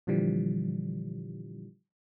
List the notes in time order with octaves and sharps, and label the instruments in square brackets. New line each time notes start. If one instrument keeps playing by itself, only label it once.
[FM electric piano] A#2 D3 E3 F3 G3